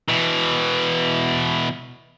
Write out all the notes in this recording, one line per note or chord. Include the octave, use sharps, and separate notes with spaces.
B2 E3